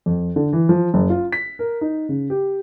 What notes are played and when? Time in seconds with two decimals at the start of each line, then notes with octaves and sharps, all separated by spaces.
0.06 F2
0.36 D3
0.53 E3
0.69 F3
0.94 F#1
1.10 F4
1.32 B6
1.59 A#4
1.81 D#4
2.09 C#3
2.30 G4